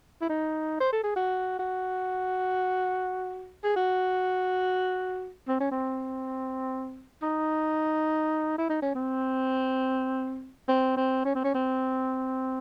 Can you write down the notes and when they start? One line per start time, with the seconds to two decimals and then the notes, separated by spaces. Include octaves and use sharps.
0.21 E4
0.29 D#4
0.80 C5
0.92 A4
1.04 G#4
1.16 F#4
1.59 F#4
3.64 G#4
3.76 F#4
5.48 C4
5.60 C#4
5.71 C4
7.22 D#4
8.58 E4
8.70 D#4
8.82 C#4
8.95 C4
10.68 C4
10.97 C4
11.25 C#4
11.35 C4
11.44 C#4
11.55 C4